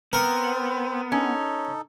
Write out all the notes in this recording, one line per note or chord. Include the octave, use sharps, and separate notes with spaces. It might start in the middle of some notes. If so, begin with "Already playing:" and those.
B3 C4 A#4 C5
C#4 D#4 A4